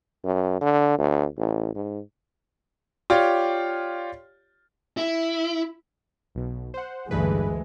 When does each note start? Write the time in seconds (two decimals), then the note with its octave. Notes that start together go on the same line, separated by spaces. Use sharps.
0.25 F#2
0.61 D3
0.98 D2
1.38 A1
1.76 G#2
3.10 F4 G4 C#5 D5
4.97 E4
6.35 B1 B2
6.74 C5 F#5
7.11 A1 D2 G2 E3 G#3 B4